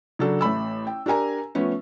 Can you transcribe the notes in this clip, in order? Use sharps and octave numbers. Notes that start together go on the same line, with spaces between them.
C#3 F#3 D4 A4
A1 A3 B5 E6
G5
D4 G4 A#4 G#5 A#5
F3 A3 B3 C#4